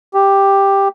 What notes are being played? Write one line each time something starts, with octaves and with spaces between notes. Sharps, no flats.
G4